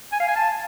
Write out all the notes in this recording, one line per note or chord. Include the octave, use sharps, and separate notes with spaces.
G#5
F5
G#5
A5